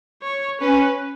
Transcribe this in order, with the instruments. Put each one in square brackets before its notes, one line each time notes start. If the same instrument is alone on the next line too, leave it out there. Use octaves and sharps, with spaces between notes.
[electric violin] C#5
[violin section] C#4 [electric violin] B4